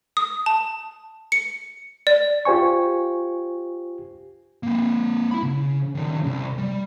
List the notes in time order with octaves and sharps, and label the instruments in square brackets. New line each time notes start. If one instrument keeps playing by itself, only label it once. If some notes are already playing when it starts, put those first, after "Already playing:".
[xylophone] D#6
A5
C#7
D5
[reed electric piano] F4 G4 C5 G#5 C#6
[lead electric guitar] A#3 C4
E4 B5
C#3
D#3 C#4
C2
G3